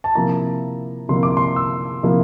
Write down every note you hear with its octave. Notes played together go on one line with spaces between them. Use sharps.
A5
C3 F3 A#3 E4 A#5
C3 F3 A#3 E4 C6
D6
C6
E6
C3 F3 A#3 E4